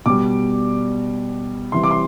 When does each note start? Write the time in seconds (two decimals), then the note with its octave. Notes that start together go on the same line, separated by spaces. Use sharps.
0.06 B2 G3 D6
1.72 C3 E3 G3 C6
1.84 D6
1.91 C6